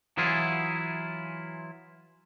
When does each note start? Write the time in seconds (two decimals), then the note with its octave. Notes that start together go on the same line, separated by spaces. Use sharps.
0.17 E3 F#3 E4 F4 G#4